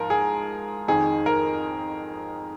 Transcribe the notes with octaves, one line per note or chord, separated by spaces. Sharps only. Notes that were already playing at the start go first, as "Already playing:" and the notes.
Already playing: G#2 F3 A#4
G#4
F2 D#3 G#4
A#4